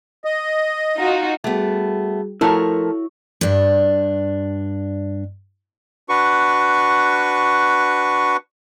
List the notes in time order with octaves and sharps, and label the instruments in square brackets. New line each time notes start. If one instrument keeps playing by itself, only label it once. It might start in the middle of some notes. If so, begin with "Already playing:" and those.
[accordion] D#5
[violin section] D#4 F4 F#4
[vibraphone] G3 F#4 G#4 [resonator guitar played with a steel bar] A3 B3
[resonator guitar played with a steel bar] F3 A3 A#4 [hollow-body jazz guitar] E4 F#4 C#5 [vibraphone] A4
[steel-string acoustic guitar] G2 D4
[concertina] D4 F#4 B4 C#6